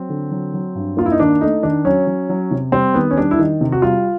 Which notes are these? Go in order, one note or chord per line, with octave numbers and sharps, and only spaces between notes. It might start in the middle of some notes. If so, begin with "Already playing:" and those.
Already playing: F#3 C4
D3
F#3
F#3
G2
A#3 F4
E4
D#4
D#3 D4
A3 D#4
D#3 D4
F#3 C#4
F#3
F#3
C3
G3 C4
D#3 B3
C#4
G3 D4
E4
D#3 D#4
C3
F#4
G3 F4